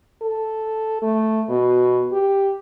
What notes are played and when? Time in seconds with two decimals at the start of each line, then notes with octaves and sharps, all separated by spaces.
0.22 A4
1.02 A3
1.49 B2
2.12 G4